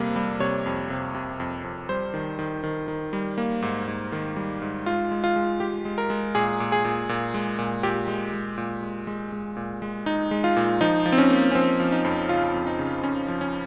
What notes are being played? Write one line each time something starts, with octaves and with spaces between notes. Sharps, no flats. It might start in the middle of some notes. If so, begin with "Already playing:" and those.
Already playing: F2 C3 G3 A#3
G3
C3 C#5
F2
C3
C3
F2
F2
G3 C5
D#3
D#3
D#3
D#3
G3
A#3
G#2
G#2
D#3
G3
G#2
G#3 F4
G#3
F4
G#3
G#3 G4
G#3
A#4
G#3
A#2 G#4
A#2
G#4
A#2
A#2
G#3
A#2
A#2 G4
G#3
G#3
A#2
G#3
G#3
G#3
A#2
G#3
G#3 D#4
G#3
F4
A#2
F3 D#4
F3
C4
C#4
A#3
C#4
F3 C4
F3
D#4
F2
C#3 F4
F2
D#4
C#3
F2 C#4
F3
C#4